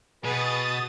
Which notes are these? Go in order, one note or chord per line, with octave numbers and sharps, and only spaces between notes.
B2 B3 G#4 B4 D#6 A6